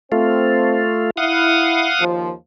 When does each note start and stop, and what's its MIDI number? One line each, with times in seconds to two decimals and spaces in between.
0.12 1.10 57
0.12 0.85 60
0.12 1.10 65
1.17 1.88 64
1.17 2.05 77
1.17 2.05 78
1.17 2.05 87
1.99 2.31 39
1.99 2.31 53